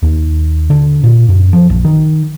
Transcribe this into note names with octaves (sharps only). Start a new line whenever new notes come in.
D#2
D3
A#2
F#2
F3
A#1
D#3